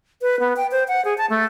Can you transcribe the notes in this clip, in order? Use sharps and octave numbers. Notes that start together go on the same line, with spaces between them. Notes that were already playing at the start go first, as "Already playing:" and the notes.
B4
B3
G5
C5
F#5
G#4
A5
A3